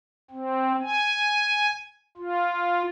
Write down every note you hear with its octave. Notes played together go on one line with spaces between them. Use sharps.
C4
G#5
F4